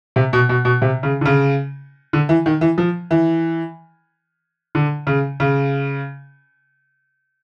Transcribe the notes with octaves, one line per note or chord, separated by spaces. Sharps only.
C3
B2
B2
B2
C3
C#3
D3
C#3
D3
E3
D#3
E3
F3
E3
D3
C#3
C#3